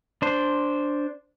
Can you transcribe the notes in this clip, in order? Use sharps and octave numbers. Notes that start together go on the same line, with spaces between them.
D4 C5